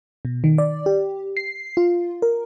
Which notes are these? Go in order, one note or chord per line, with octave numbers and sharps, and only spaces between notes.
B2
D#3
D5
G4
C7
F4
A#4